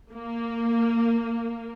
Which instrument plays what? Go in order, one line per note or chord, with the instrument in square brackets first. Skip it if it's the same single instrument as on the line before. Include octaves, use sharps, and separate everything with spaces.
[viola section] A#3